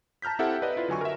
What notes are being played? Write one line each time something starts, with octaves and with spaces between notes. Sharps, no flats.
A5 A#5 F6 G6 B6
C4 E4 G4 A4 E5 F#5
B4 D5 D#5
E4 F4 B4
D3 F#3 G#5 C#6
A#4 E5